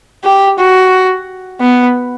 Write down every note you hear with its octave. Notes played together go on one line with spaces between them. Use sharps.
G4
F#4
B3